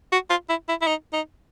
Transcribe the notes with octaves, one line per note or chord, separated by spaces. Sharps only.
F#4
F4
E4
E4
E4
D#4
D#4